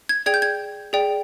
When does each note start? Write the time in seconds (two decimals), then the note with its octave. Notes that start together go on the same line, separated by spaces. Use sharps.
0.09 G#6
0.26 G#4 D5 G5 G#6
0.34 G6
0.42 G#6
0.93 G#4 D5 G5